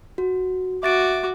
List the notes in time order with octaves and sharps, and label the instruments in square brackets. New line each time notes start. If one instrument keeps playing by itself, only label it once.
[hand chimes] F#4
[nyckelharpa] F#4 D6 [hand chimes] E5 A6 D7